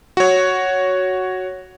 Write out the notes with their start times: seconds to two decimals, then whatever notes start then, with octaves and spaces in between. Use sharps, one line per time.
0.17 F#4 C#5